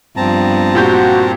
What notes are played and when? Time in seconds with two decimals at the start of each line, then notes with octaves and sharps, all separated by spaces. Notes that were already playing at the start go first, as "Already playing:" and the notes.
0.17 G2 F3 B3 C4 A5 A#5
0.75 A#2 F#4 G4 G6